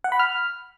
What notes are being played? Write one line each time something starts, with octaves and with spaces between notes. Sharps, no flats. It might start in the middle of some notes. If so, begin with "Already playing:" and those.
F#5
B5
F6